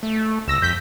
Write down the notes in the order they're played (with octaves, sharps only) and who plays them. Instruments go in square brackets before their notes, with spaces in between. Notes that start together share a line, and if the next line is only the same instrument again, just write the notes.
[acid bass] A3
[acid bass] C#2 [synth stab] E6 A#6
[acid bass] F2 [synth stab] G6 B6